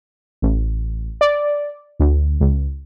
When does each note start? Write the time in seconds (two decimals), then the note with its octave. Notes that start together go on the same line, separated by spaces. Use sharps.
0.42 A1
1.21 D5
1.99 D2
2.40 C#2